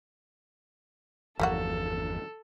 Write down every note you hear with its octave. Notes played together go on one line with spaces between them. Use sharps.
G1 E2 F3 G3 A#3 F#4 A4